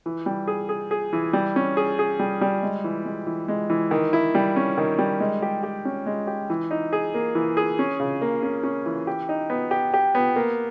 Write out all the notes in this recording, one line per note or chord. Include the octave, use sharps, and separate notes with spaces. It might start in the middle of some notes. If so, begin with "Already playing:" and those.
E3
G3
G#4
G#4
G#4
E3
G3
C#4
G#4
G#4
G3
G3
G#3
E3
G#3
E3
G#3
E3
D#3
E4
G3
C#4
D#3
G3
G#3
G4
G4
C#4
G#3
G4
E3
D#4
G#4
A#3
E3
G#4
C#4
C#3
A#3
C#4
C#4
E3
G4
D#4
B3
G4
G4
B3
A#3